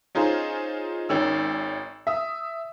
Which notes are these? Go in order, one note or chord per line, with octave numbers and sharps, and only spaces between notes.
C#4 D#4 F4 G#4 C5
G#1 D#3 C#4 E6
E5 D#6